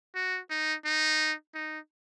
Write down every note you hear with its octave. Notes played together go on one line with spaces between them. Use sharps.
F#4
D#4
D#4
D#4